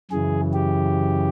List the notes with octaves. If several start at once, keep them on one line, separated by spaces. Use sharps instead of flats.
F#2 C#3 E3 G#4
G4